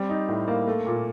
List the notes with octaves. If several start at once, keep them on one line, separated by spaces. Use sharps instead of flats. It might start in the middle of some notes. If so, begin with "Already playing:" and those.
Already playing: G3 C4
D#4
A2
A#3
A3
A#2